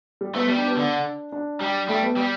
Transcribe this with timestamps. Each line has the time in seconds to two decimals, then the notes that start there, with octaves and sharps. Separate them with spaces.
0.21 G3
0.35 A3 B3
0.48 G3 B3
0.58 D4
0.67 B3
0.76 D3 D4
1.32 D4
1.61 G3
1.88 G3 A3
2.03 B3
2.17 G3